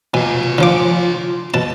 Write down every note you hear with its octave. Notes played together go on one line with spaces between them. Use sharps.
B2 F4 G#5
D3 F3 D6
B2 A5